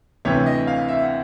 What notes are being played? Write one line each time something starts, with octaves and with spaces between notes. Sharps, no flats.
D2 C3 E3 C#5
D#5
F5
E5
F#5